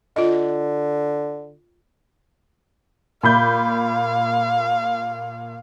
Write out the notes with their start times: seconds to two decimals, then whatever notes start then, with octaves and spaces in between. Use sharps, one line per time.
0.16 D3 F4 D#5
3.23 A#2 F5 B5 G6